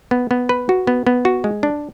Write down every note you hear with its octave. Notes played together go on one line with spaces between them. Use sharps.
B3
B3
B4
F#4
B3
B3
F#4
G#3
D4